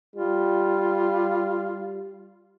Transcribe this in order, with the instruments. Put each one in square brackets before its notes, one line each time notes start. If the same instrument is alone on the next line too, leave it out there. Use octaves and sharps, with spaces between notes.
[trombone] G3 [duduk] F4